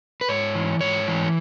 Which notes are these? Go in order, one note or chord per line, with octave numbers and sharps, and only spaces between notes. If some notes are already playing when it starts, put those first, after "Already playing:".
B4
G#2 C#5
E3
G#2 C#5
E3